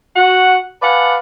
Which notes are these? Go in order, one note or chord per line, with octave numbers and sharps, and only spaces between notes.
F#4 F#5
B4 D5 F5 F#5 G#5 A5